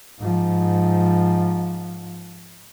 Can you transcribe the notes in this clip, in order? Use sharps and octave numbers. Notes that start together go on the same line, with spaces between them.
G#2 F3